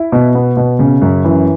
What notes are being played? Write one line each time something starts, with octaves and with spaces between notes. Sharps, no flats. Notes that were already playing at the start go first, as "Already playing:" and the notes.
Already playing: E4
B2
B3
B2
C#3
F#2
E3